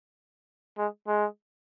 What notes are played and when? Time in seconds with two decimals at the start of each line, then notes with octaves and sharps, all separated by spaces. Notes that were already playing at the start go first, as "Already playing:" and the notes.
0.78 G#3
1.08 G#3